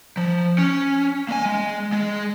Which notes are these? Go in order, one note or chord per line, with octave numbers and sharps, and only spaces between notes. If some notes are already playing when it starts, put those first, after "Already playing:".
F3
C#4
A#3 G#5
G#3
G#3